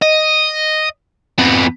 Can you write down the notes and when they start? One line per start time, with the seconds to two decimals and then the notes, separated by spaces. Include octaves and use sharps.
0.02 D#5
1.39 F2 B3